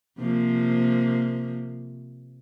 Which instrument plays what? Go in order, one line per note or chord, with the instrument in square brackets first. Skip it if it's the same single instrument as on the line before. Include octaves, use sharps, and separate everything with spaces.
[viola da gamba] C3 F3 A#3